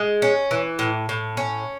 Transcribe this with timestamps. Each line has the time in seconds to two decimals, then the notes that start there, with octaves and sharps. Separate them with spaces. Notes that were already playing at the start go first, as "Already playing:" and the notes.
Already playing: G#3
0.22 C#4
0.51 E3
0.79 A2
1.09 A2
1.37 C#4